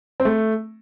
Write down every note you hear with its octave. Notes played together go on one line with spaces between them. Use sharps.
C4
A3